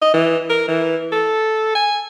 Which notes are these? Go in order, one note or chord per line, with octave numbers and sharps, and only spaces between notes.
D#5
E3
A#4
E3
A4
G#5